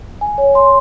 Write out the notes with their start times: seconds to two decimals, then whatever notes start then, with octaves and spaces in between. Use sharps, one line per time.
0.21 G#5
0.38 C#5
0.55 C6